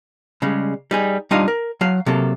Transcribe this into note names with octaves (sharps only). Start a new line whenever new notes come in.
C#3 G3 G#3
G3 D#4 G#4
G3 D4 D#4 F4 D#5 F5
A#4
F#3 F5
C3 F#3 A#3 A4